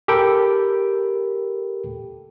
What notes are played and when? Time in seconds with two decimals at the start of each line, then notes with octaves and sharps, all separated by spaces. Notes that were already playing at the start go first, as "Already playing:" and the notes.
0.08 G4 A4 A#4 G5 B5